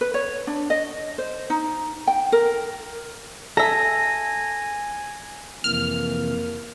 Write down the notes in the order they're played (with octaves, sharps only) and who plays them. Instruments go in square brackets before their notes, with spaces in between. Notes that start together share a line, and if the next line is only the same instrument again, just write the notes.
[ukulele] B4
C#5
D4
D#5
C5
D#4
G5
A#4
[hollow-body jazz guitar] A4 [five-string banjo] E5 A#5 [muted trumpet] G#5 [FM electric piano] A#6
[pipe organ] F2 C3 E3 [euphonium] A#3 [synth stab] F6